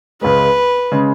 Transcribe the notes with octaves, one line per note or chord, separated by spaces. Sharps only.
C#2 C#3 G#3 B4
C#3 G#3